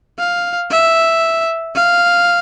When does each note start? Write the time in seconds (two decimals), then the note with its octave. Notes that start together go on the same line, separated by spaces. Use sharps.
0.19 F5
0.71 E5
1.75 F5